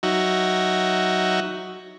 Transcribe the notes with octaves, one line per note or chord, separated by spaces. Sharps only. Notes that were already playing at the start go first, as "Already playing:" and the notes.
F#3 D#4 F#4 E5